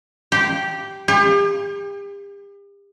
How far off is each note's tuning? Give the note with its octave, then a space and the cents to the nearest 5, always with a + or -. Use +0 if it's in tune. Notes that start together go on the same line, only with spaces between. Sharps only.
G4 -10
G4 +40